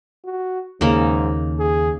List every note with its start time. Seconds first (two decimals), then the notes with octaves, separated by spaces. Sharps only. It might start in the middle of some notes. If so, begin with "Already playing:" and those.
0.25 F#4
0.81 D#2 G#2 C#3 A#3 D#4
1.59 G#4